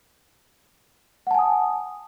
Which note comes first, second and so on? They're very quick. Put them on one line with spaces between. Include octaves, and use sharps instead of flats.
F#5 A5 G#5 D#6